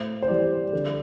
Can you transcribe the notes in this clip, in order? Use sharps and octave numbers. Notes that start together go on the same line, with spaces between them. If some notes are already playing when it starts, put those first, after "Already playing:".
Already playing: A2 C5
C5
E3 G3 D5
D3